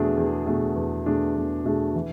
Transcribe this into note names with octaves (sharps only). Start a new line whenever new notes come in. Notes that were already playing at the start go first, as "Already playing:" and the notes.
Already playing: E2 B2 A3 D4 G#4
E2
B2 A3 D4 G#4
E2
B2 A3 D4 G#4
E2
B2 A3 D4 G#4
E3